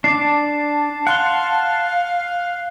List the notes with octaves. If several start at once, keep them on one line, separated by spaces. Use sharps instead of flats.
D4 D5 A5 D6 C7
F5 F#5 C6 F#6 G7